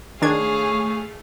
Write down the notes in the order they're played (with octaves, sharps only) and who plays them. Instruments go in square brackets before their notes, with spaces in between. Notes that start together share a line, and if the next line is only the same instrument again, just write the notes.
[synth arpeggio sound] D#3 D4 G#6 [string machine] A3 [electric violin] G#4 F5 [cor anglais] C#5